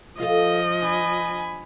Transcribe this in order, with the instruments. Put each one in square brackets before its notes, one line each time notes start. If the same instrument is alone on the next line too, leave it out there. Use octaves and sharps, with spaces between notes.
[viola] F3 D#5 [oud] F4 G#4 A4
[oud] D4 [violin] G#5 B5